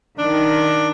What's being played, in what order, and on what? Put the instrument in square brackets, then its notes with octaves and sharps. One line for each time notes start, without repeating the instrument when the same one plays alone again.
[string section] D#3 [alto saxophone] D4